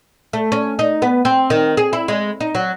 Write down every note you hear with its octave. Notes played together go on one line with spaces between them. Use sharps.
A3
C#4
D#4
B3
C4
D#3
G#4
E4
G#3
D#4
F#3